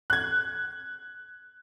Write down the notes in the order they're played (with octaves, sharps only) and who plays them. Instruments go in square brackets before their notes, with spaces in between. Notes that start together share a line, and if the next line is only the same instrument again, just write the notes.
[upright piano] F#6 G#6